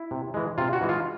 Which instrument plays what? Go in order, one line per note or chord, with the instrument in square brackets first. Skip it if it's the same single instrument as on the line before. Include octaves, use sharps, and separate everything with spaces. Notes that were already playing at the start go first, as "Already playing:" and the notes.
Already playing: [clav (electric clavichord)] E4
C3
E3 G#3
C3 F4
F#4
E3 G#3
F4